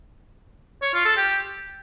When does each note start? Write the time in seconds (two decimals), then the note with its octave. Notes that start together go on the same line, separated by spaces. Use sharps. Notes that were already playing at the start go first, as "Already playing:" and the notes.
0.82 C#5
0.93 F4
1.05 A4
1.17 G4